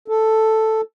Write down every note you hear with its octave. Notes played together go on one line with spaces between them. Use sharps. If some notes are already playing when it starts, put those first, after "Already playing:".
A4